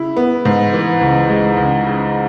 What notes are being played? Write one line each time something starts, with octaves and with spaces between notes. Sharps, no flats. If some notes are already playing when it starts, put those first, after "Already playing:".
Already playing: C#3 E4
B3
G#2
E3
C#2
G#3
C#2
C#3